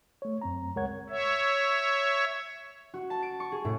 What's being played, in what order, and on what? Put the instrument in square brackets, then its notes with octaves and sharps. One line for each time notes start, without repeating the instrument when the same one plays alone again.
[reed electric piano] A3 C#5
F#2 C4 A#5
C#2 G#3 A#4 C#5 F#5 G#6
[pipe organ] C#5 E5
[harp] F#4
A5
D7
C#6
G#4
A2